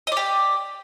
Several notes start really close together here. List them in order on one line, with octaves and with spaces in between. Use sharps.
D#5 D5 G4